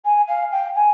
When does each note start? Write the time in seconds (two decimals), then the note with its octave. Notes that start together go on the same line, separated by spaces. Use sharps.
0.05 G#5
0.27 F5
0.51 G5
0.75 G#5